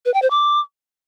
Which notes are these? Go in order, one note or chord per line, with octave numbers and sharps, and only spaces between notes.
B4
G5
C5
D6